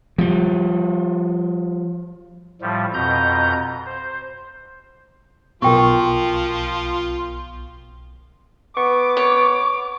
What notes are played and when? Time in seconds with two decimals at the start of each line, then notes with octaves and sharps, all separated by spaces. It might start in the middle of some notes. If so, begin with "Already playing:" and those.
0.18 F3 G3
2.62 A2 F3 G3
2.94 F2 B2 A#5 G6
3.86 C5
5.62 B1 B2 F3 F4 A#4 G5 C#6
8.77 B3 C#6 D6
9.17 C#5